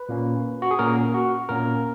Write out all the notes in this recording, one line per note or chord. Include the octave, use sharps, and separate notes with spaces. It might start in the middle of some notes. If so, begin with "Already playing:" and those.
Already playing: B4
A#2 A#3 C#4
F#4
G#4
A#2 A#3 C#4 A#4
F#4
A#2 A#3 C#4 A#4